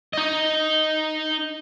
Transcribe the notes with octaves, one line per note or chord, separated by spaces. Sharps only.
D#4 D#5